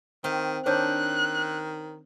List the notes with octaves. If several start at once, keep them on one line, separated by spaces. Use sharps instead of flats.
D#3 C4 F5
D#3 D4 C5 C#5 F#6 G6